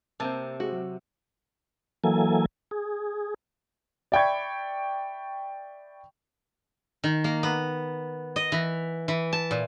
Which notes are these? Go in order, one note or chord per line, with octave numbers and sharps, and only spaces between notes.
C3 A#3 C4 A5
G#3 F#4
F#3
E3 F#3 A#3 A4 G#5
G#4
D5 E5 G5 B5 C#6 G#6
D#3
A#3
B3
D#5
E3
E3
A5
A#2